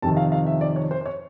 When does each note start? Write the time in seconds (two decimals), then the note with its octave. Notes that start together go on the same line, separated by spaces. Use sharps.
0.02 F2 C3 D#3 A5
0.17 F5
0.32 F5
0.46 E5
0.61 D5
0.76 C#5
0.91 C5
1.01 C5
1.06 C#5